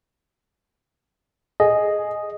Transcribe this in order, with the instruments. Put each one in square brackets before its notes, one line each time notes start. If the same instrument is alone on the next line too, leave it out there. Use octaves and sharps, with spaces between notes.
[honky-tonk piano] G#4 [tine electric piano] D#5